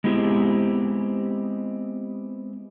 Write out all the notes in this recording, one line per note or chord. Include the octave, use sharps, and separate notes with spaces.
G#3 B3 C4 E4 G4